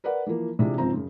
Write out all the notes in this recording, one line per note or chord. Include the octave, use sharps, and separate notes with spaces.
A#4 B4 D5 F#5
E3 F3 A#3
C3 E3 G#3 D4 F4
G#1 C#2 F3 C4 A#5
F#2 C#3